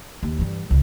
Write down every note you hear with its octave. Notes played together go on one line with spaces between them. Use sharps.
D#2
G2 E3
G#1 C#2